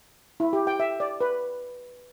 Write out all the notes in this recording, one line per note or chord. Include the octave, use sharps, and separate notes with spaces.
E4
G4
G5
E5
D5
B4